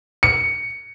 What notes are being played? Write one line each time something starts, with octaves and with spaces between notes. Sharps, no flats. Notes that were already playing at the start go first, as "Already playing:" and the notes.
C#7